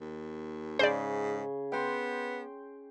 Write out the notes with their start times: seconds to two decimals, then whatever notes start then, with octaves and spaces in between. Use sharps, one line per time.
0.01 D#2
0.79 G#2 C#3 C5 D5
1.72 B3 G5 C6